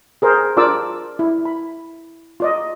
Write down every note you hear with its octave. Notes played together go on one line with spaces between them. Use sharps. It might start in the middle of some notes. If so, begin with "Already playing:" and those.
G#4 A#4 C5
D4 F4 A#4 D5 D6 E6
E4
B5
F4 D5 D#5